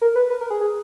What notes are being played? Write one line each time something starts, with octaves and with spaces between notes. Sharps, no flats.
A#4
B4
B4
A#4
G#4
G#4